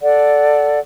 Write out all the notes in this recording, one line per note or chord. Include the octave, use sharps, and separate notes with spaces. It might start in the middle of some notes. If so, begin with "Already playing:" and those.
A4 D5 F#5